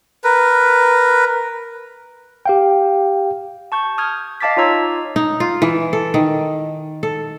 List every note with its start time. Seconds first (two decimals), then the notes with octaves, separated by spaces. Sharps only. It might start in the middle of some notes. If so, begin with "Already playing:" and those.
0.24 A#4 B4
2.46 G4 F5 G5
3.72 A5 C#6 G6
3.98 D#6 F6 G6 G#6
4.41 D#5 F5 A5 D6 A6 B6
4.57 D#4 F4 C#5 A#5 E6 G#6
5.16 D#4
5.40 F4
5.62 E3
5.93 A4
6.14 D#3
7.03 A4